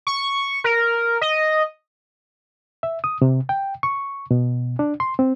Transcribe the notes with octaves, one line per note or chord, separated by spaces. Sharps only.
C#6
A#4
D#5
E5
D#6
C3
G5
C#6
B2
D4
C6
C4